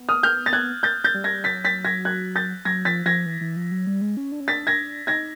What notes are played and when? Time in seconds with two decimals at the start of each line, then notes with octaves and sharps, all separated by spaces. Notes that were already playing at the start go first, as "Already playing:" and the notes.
Already playing: B3
0.09 D#6 F6
0.23 F6 G6
0.46 A6
0.53 F#6 G#6
0.83 G6 A6
1.04 G6 A6
1.14 G3
1.24 G#6 A#6
1.44 F#3 A6 B6
1.65 A6 B6
1.85 G#6 A#6
2.05 F#6 G#6
2.35 G6 A6
2.65 F#3 G#6 A#6
2.85 F3 A6 B6
3.06 F3 G#6 A#6
3.26 E3
3.41 E3
3.56 F3
3.71 F#3
3.87 G3
4.01 G#3
4.17 C#4
4.32 D4
4.40 C#4
4.48 D4 A6 B6
4.67 G#6 A#6
5.07 D#4 G#6 A#6